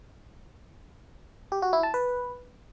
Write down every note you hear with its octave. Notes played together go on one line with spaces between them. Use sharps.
G4
F#4
E4
A5
B4